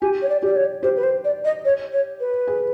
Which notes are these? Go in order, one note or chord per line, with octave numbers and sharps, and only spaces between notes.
G4 G#5
C#5
D5
G4 D5
C#5
G4 C5
B4
C5
D5
D#5
C#5
C#5
B4
G#4